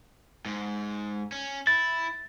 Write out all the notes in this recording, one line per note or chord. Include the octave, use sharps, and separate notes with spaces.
G#2
C#4
E4 A6